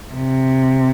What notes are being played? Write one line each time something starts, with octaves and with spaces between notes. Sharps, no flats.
C3